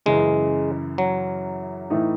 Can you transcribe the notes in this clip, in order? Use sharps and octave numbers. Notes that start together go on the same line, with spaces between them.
F#2 C#3 E3 G#3
F#3
A2 E3 A3 D#4